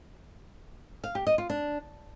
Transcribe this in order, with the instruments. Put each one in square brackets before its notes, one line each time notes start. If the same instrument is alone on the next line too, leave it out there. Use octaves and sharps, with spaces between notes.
[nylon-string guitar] F5
G4
D#5
F4
D4